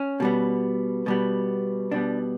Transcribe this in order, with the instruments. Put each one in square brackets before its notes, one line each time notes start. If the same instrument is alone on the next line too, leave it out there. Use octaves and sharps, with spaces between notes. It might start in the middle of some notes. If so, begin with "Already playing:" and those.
Already playing: [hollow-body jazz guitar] C#4
B2 G3 B3
B2 G3 B3
B2 G3 B3 D4